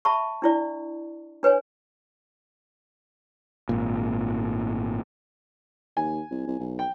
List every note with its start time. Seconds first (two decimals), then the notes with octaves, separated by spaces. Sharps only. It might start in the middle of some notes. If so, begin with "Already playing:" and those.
0.05 E5 A5 B5 C#6
0.42 D4 E4 D5
1.43 D4 B4 C#5 G#5
3.69 G#1 A#2
5.97 D#2 G#5
6.31 C2
6.47 C2
6.60 B1
6.79 G5